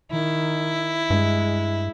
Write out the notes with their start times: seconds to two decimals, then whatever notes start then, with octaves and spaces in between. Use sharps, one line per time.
0.11 D#3 E4
1.10 G2 G#3